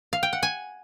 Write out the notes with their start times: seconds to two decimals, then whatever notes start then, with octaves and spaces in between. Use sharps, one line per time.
0.13 F5
0.23 G5
0.33 F#5
0.43 G#5